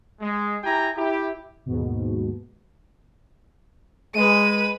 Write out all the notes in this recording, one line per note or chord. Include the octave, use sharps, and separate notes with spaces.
G#3
E4 G4 G5 G#5 A#5
E4 G4
D#2 G#2 B2
G#3 B4 D#7